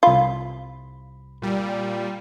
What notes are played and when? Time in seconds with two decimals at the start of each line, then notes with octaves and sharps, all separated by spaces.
0.03 C2 F4 B5
1.42 A#2 G3